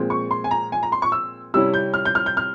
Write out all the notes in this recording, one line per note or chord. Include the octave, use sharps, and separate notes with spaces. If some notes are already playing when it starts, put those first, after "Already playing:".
Already playing: A#2 F3 G#3 C4
C#6
C6
G#5
A#5
G#5
A#5
C6
C#6
E6
C3 G3 C#4 E4 E6
G6
F6
G6
F6
G6
F6